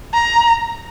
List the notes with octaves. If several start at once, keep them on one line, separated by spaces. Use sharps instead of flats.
A#5